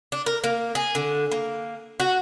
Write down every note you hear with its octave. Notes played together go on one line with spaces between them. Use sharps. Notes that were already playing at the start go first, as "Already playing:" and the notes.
D4
A#4
A#3
G#4
D3
A#3
F#4